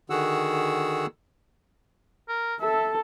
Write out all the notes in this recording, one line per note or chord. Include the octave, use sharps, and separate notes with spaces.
D3 D#3 F#4 G#4 F#5 E6
A#4
A4 E5